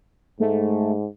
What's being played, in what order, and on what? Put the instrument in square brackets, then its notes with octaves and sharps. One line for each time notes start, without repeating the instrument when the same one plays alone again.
[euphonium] G#2 [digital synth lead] A3